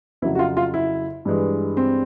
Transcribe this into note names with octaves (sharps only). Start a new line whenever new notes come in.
F2 C#3 F#3 E4
F#4
F4
F4
E4
G2 E3 G#3
C4